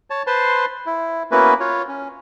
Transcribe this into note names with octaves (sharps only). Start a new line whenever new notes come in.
C#5 A5
B4 C5 A5 C6
E4
A#3 B3 C#4 E4 F#4 B4
F4 C#5
C#4